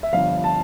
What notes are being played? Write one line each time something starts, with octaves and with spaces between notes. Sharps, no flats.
E5
G1 G2 F3 F5
A5